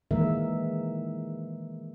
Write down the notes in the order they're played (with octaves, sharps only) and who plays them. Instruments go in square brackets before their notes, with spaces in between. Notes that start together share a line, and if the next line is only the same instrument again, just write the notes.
[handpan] D#3 E3 G#3 A#3 A#4 E5